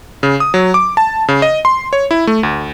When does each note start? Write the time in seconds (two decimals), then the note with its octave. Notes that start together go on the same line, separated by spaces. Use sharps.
0.23 C#3
0.40 D#6
0.54 F#3
0.74 D6
0.97 A5
1.28 C#3
1.42 D#5
1.65 C6
1.93 C#5
2.11 E4
2.27 A3
2.43 D2